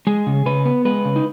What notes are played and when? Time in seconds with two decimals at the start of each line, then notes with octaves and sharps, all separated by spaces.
0.07 G#3 G#4
0.27 C#3
0.46 C#3 B4
0.65 B3
0.85 G#3 B4
1.05 C#3
1.16 D#4